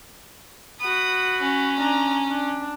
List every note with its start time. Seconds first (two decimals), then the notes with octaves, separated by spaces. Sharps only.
0.80 F#4 B5 D#6
1.41 C#4
1.78 D4 A#5
2.28 D4